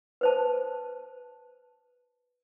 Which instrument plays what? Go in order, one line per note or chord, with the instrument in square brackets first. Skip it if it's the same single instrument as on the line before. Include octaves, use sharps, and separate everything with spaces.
[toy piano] B4 C5 A5